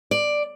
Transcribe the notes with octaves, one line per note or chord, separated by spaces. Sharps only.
D5